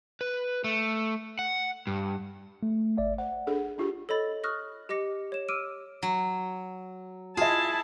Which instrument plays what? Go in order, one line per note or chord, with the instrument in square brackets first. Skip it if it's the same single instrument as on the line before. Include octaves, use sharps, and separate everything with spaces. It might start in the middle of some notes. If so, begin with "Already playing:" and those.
[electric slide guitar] B4
A3
F#5
G2
[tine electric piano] A3
G#1 D5 E5
[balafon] C5 [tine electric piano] F#5
[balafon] D4 G#4 A4
D4 F4 G4
[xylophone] A4 C#5 D#5 B5 A6
C#6 D#6 F6 F#6 A#6
G4 D#5 D6 A#6 C#7
C#5 E7
D6 E6 F6 D7 D#7
[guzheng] F#3
[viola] E4 A5 [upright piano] F4 D#5 [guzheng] G#4